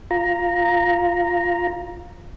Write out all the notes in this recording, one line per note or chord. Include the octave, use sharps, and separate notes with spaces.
F4 A#5